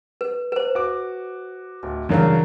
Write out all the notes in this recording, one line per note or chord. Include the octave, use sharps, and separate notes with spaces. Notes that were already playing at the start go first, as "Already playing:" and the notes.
B4
B4 C5
F#4 D6
D1
G2 C#3 E3 F#3 A#4 F5